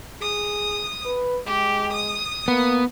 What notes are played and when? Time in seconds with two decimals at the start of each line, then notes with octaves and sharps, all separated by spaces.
0.21 G#4 D#6
1.05 B4
1.46 G#3 G4
1.93 D#6
2.48 A#3 B3